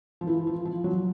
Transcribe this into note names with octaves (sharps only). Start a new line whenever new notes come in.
F3
E3
F3
F3
F#3